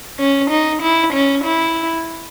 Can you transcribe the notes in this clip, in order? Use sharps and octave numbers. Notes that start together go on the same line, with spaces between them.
C#4
D#4
E4
C#4
E4